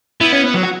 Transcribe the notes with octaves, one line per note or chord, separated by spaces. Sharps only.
B3 E4
C#4
B3
F#3
F#4